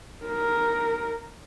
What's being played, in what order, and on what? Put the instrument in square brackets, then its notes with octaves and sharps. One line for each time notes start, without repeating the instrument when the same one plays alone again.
[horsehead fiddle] D#4 A#4